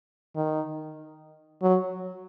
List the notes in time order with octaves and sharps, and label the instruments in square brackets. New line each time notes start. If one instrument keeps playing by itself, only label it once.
[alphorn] D#3
F#3